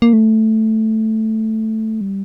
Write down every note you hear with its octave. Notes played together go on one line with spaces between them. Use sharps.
A#3
A3
G3